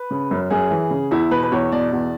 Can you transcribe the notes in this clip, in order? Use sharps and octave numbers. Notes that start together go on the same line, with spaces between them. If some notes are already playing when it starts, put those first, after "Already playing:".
Already playing: B4
C#3
F#2
F#2 G#4
E3
C#3
E2 E4
B2 B4
B4
E2 C#5
B2 D5
E2